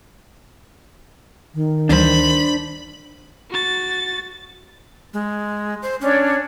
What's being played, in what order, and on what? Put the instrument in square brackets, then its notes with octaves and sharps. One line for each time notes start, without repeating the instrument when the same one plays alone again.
[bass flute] D#3
[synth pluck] D2 E3 G3 [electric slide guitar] D4 C5 [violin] B5
[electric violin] F#4 A6
[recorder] G#3
C5
[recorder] C#4 [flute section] D4 C#5